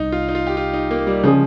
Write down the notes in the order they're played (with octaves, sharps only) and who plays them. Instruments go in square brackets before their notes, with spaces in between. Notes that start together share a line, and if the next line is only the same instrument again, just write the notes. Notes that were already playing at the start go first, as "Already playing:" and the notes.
Already playing: [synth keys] C2 [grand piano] D#4
[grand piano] F4
D#4
F4
G4
F4
D#4
A#3
G3
[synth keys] C#3 G#3 C#4 G#4 [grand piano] F3